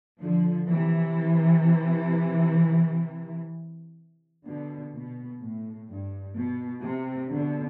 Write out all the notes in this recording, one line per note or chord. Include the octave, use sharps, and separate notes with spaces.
D3 F3
C3 E3
B2 D3
B2
A2
G2
B2
C3
B2 D3